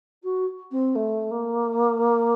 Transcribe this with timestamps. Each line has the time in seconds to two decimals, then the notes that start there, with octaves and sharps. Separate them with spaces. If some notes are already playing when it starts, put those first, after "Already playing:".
0.23 F#4
0.71 C4
0.95 A3
1.31 A#3